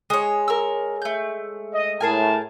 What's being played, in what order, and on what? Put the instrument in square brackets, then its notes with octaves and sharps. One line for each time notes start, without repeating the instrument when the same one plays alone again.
[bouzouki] G#3 C#5 [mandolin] D#6
[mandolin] A#4 E6
A3 G6
[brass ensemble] D#5
[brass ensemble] A2 A5 [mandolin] G#4 A#4 G#5